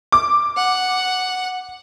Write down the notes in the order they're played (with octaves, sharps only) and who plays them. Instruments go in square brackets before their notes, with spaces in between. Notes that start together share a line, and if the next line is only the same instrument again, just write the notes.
[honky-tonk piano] D6
[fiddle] F#5